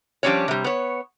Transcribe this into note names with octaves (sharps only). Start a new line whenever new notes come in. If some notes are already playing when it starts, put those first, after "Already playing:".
F3 G3 G#3 C#4 D4 C#5
C3 G3
B3 C#5